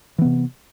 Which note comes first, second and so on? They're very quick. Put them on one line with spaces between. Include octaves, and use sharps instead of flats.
E3 B3 C3